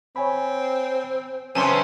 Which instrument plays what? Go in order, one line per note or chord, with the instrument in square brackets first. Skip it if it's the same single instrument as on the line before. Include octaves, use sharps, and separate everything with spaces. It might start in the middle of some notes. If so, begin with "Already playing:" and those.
[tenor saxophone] C4 [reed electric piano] C#5 G#5 B5
[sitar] F#2 C#3 C#4 [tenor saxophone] C4 [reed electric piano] B4 [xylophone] G#5 A5 C6